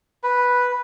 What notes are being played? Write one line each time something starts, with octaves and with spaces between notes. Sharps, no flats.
B4